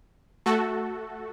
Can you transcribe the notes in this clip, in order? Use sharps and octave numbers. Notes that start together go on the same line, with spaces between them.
A3 F#4 A4